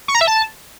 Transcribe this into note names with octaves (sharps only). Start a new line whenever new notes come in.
C#6
A#5
E5
A5